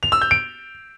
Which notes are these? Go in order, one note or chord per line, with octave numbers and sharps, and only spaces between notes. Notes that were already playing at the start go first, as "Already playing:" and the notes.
F7
E6
G6
D7